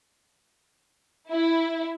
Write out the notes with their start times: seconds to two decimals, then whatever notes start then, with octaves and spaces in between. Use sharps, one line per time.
1.30 E4